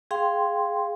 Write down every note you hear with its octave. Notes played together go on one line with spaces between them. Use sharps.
G#4 F5 G5 C6